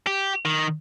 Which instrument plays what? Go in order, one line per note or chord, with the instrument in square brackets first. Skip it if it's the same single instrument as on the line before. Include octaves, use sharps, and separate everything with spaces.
[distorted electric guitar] G4
D#3